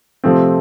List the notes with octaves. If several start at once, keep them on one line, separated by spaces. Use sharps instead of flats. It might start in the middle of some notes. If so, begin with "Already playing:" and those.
C3 F3 A3 C4